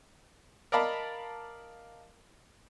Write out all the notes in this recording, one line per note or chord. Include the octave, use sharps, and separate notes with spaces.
A#4 D5 D#5 F5 A5 B5